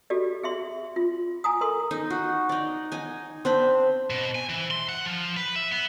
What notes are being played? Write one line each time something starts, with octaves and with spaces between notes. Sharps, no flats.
F#4 G4 A4 D5
G#4 E5 C6
F4
G#5 A#5 D#6
A4 A#4 C6 D#6
D#4
F#4
D#4 D5
D#4 G#5
C4 D4 B5
B2
G#5
E3
C6
F#5
F3
B4
E5
B3